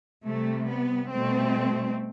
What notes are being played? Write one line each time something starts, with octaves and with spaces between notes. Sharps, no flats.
C3 G3 A3
B3
B2 G3 A3 C4